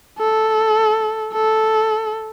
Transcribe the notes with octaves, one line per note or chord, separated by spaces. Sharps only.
A4
A4